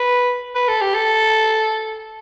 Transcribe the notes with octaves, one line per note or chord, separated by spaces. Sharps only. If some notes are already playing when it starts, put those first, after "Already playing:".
Already playing: B4
B4
A4
G4
A4